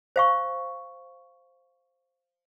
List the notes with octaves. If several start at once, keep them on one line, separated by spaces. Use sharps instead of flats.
C5 F5 C#6